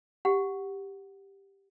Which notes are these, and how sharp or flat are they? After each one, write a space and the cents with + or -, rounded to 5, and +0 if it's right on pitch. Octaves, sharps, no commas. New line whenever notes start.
G4 +0 F#5 +0